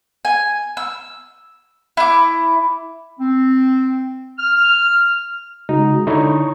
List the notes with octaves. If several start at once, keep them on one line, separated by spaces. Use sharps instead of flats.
G#5
E6
E4 D6
C4
F6
C#3 G#3 D#4 F#4
D3 D#4 E4 C#5 C#6